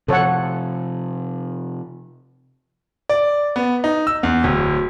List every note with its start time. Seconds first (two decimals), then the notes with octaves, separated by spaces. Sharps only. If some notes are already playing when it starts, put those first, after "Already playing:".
0.08 C3 F3 A4 C#5 F#5
3.09 D5
3.56 B3
3.84 D#4
4.07 E6
4.23 E2
4.44 D1